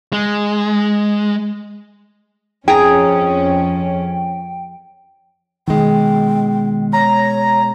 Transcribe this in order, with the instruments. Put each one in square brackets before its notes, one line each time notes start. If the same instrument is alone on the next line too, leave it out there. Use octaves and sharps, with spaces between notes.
[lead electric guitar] G#3
[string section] F2 C#4 [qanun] G#4 A#5 [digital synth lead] G5
[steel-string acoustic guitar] B2 G#3 [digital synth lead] D#3 [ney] G5
[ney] C#5 [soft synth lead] A#5